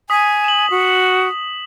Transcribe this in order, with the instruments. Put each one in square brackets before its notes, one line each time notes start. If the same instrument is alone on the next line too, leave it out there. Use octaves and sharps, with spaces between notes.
[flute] G#5 [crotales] D#6 B6
[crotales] E7 F#7
[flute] F#4